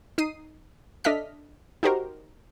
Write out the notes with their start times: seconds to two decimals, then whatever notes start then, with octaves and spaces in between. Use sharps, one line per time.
0.18 D#4 D#6 C7 D#7
1.04 D4 A4 D#5 E5 F6 B6
1.83 D#4 F#4 G4 A#4 C5